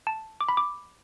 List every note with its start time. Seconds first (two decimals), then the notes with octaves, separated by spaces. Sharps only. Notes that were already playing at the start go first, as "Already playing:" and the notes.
0.07 A5
0.41 D6
0.49 B5
0.57 D6